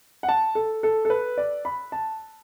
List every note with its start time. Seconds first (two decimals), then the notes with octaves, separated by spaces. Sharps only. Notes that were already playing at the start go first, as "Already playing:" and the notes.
0.23 F#5
0.29 A5
0.55 A4
0.83 A4
1.05 A4
1.10 B4
1.38 D5
1.65 B5
1.92 A5